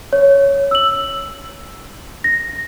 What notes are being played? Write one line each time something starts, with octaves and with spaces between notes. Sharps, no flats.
C#5
E6 F#7
A#6